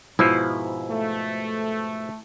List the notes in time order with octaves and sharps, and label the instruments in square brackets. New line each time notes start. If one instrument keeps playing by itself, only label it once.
[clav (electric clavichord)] G#2 B2 F3 [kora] E4
[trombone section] A3